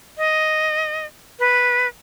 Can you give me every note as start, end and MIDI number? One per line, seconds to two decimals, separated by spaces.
0.18 1.06 75
1.39 1.88 71